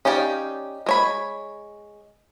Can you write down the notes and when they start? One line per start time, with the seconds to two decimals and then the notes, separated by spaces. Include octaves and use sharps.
0.05 C#4 D#4 G4 D5 F5
0.86 G#3 C#5 B5